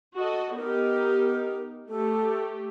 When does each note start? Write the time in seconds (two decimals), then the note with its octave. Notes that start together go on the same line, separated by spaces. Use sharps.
0.16 F#4 A4 D#5
0.57 B3 D#4 G4 A#4
1.89 A3 G4 A4